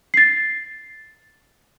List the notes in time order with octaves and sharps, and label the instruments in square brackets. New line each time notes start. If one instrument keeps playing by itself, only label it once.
[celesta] A6 C7